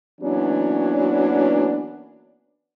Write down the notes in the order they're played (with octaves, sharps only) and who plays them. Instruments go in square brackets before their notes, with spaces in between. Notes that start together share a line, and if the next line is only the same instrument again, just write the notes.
[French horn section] E3 F#3 A#3 B3 C#4 D4